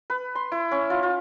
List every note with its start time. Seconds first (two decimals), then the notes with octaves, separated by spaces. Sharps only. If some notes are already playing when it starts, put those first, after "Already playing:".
0.10 B4
0.35 C6
0.52 E4
0.71 C#4
0.90 F4
1.03 F4